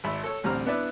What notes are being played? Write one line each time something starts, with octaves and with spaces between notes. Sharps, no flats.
G#1 E5 B5
A4 C#5
A1 D2 G3 C4 A#5 F6
B3 D4 E4 B4 D5 E5